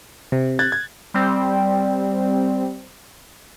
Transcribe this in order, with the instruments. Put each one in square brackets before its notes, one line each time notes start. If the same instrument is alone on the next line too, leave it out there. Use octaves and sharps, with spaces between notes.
[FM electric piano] C3
[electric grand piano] F#6 G#6 A6
G#6
[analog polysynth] G3 C4